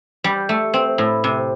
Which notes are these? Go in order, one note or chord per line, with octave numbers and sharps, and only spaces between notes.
G3
A3
C4
A2
C3